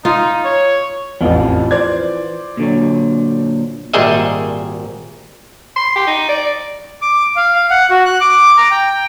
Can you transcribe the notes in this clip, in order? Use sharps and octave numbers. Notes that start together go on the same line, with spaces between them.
D#4 F4
C#5
A1 F2 E3 F4
C5 D5 G#6
A#2 D3 F#3
G#1 A#2 G3 G#4 D#5 E5
C6
G4
D#4
D5
D6
F5
F5
F#5
F#4
F#6
D6
A#5
G5